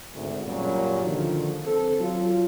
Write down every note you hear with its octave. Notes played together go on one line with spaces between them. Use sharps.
G#1 D2
F#2 A#2 C#3 F#3 G3
D3 D#3 F3
C4 A4
F#3 F4